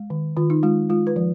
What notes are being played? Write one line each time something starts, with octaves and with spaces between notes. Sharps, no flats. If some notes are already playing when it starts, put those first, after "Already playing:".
Already playing: G#3
D#3
D#3 F4
D#4
G#3 F4
G#3 F4
B4
F3